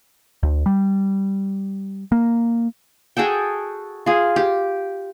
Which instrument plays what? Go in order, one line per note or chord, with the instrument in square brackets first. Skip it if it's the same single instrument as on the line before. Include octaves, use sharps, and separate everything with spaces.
[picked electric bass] D2
G3
A#3
[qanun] F#4 G#4 A4 G5
F4 G#4
G4